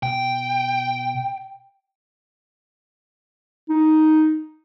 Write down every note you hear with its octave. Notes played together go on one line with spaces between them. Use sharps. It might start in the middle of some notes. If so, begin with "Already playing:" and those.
B2 G5
D#4